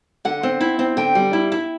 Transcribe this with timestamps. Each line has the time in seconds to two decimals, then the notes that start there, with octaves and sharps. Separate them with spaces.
0.25 D3 F#5
0.43 C4
0.61 E4
0.79 C4
0.97 D3 G5
1.15 G3
1.33 E4
1.52 E4